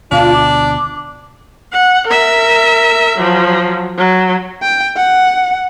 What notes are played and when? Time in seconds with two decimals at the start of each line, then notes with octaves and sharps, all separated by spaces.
0.11 D2 B2 D4 F4 F5
0.33 D6
1.73 F#5
2.07 A#4 E5
3.18 F3 F#3
3.98 F#3
4.63 G5
4.97 F#5